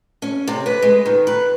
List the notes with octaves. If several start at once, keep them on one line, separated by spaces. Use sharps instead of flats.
C#4
C3
B4
G#3
D#3
B4